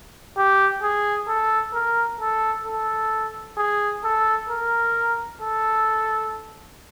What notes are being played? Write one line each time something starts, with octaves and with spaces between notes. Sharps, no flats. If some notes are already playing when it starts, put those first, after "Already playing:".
G4
G#4
A4
A#4
A4
A4
G#4
A4
A#4
A4